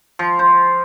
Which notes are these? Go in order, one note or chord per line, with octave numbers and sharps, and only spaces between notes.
F3
C5